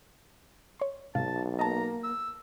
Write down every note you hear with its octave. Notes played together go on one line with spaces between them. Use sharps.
C#5 C6
B1 G#2 C3 F5 A5
A#3 D#5 A5 A#5
E6